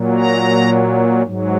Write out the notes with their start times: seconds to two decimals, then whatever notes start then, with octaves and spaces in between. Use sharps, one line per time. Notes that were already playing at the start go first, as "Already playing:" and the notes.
Already playing: A#2 F#3
0.17 A#5
1.23 G#2 F#3